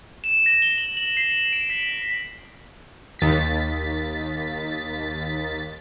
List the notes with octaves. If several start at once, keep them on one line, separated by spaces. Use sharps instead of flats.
E7
A#6
G7
F#7
F#7
C7
D7
B6
D#2 A6 B6